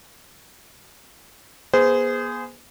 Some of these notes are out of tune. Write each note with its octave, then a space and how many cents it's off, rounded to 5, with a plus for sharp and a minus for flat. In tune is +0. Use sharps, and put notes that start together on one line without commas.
B3 -40 G#4 +0 C5 -25